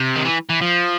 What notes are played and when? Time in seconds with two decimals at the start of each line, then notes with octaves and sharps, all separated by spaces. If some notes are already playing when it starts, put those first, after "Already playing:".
Already playing: C3
0.16 D#3
0.25 E3
0.50 E3
0.61 F3